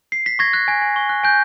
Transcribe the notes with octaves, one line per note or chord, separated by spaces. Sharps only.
C7
B6
C#6 G#6 A#6
F#6 G#6
G#5 G#6
G#5
C#6
F#6
G#5 G6